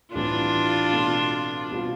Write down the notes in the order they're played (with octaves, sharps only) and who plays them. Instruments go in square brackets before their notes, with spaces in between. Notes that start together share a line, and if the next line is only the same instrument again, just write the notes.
[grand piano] A2 E3 G3 C4 E4 [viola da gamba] D4 F4
[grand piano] B2 A3 C4
B2 G3 C4 F4